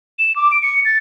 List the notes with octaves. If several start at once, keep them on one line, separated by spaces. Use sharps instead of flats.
E7
D6
D7
C#7
A6